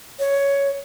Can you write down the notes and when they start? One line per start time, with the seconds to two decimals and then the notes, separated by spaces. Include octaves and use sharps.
0.19 C#5